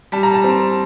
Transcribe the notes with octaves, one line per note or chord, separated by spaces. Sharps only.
G3 A5
A#5
A5
C4